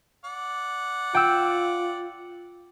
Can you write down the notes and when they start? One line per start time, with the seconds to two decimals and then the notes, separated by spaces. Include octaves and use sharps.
0.24 D5 F#5
1.15 F4 G5 E6